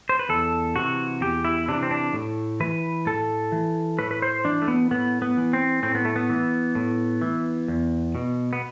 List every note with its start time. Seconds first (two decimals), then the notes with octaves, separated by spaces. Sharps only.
0.09 C5
0.19 B4
0.29 E2 A4
0.76 C3 E3 F#4
1.21 E2 G4
1.45 E4
1.68 C3 E3 D4
1.83 C4
1.91 D4
2.14 A2
2.60 E3 B4
3.06 A2 A4
3.52 E3
3.99 A2 B4
4.11 B4
4.22 C5
4.44 E3 D4
4.62 A3
4.68 B3
4.91 A2 B3
5.22 B3
5.37 E3
5.53 C4
5.83 A2 C4
5.95 B3
6.05 A3
6.16 B3
6.30 E3
6.75 A2
7.22 E3
7.68 E2
8.15 B2
8.53 B3